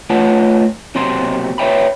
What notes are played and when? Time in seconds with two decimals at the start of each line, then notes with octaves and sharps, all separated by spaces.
0.10 A3 F4 B4 C#5 F#5 A5
0.95 B1 C3 F#3 A#3 C4 C6
1.58 B4 C#5 E5 G5 B5